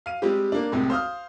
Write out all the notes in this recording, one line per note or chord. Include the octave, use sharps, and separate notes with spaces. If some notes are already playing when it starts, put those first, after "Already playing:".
F5 D#7
G3 G#3 C4 G4
A#3 D4
C2 A2 C3 G#3
C5 F5 D#6 F6